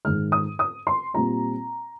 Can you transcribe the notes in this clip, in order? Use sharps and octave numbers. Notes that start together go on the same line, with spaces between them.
G#2 D#3 G#3 F6
D#6
D#6
C6
A#2 G3 C4 F4 A#5